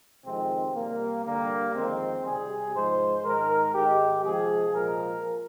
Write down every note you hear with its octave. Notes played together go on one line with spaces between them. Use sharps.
F2 C3 D#3 G#3 C4
C3 G3 A#3
G2 D3 G3 A#3
F2 D#3 G#3 C4
C3 G3 G#4
G#2 F3 G#3 C5
G#2 D#3 G#3 A#4
G#2 D#3 G#3 G4
C3 F3 G#3 G#4
A#2 F3 G#3 A#4